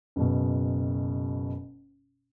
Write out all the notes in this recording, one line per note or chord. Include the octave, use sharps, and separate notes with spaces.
F#1 B2